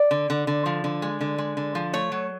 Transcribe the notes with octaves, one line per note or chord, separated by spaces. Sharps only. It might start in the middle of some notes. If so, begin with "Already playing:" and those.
Already playing: D5
D3
D3
D3
F3
D3
G#3
D3
G#3
D3
F3
A3 C#5
F#3